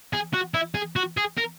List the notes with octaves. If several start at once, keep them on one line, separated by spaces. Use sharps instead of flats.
G#4
F#4
E4
G#4
F#4
G#4
A#4